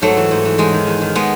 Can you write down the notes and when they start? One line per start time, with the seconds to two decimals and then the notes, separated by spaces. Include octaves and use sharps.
0.01 G#2 F#3 A3
0.17 E3
0.31 G#2
0.45 E3
0.58 E2 G#3
0.73 D#3
0.87 E2
1.02 D#3
1.15 G#3 B3